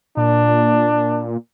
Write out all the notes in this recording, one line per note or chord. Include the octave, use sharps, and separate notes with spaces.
A#2 D4